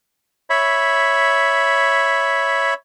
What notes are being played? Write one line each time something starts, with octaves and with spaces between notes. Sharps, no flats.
C#5 E5 B5